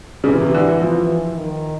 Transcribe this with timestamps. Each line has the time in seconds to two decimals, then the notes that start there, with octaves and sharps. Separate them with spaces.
0.24 C#3
0.28 C3 E3
0.41 C3
0.54 D3
0.68 E3
0.80 E3 F3
1.34 D#3